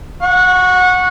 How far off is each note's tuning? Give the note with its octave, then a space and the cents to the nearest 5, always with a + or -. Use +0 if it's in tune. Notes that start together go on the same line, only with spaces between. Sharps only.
F#5 -20 C#6 +0